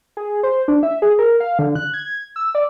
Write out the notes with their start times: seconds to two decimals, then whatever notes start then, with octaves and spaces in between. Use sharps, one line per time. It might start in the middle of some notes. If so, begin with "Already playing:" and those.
0.17 G#4
0.43 C5
0.68 D4
0.83 E5
1.02 G#4
1.19 A#4
1.40 F5
1.59 D3
1.75 F#6
1.94 G#6
2.36 E6
2.55 D5